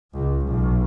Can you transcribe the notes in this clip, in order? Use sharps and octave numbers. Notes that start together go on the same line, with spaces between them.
C#2
B1